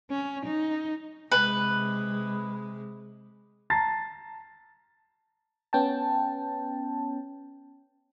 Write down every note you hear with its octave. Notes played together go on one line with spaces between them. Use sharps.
C#4
D#4
C3 G#3 B4
A5 A#5 A6 C7
B3 C#4 G5 A5